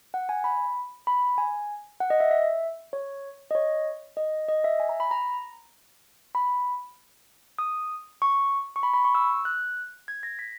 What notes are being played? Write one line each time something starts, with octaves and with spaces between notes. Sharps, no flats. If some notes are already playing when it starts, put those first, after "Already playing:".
F#5
G#5
B5
B5
G#5
F#5
D#5
E5
E5
C#5
D#5
C#5
D#5
D#5
E5
G#5
A#5
B5
A#5
B5
D#6
C#6
C#6
B5
B5
C#6
E6
F#6
G#6
A#6
B6